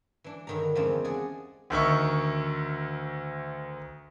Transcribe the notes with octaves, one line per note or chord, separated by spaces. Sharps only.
E3 D4
G2 D3 D#3 F#3 A#5
E2 C#3 F3 G#3 C4 D4
G#4 D5 D#5 F#5
D2 D#3 E5 C#6